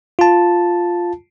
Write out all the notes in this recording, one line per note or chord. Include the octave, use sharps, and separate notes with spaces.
F4 A5